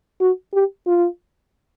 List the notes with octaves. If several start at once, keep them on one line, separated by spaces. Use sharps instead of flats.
F#4
G4
F4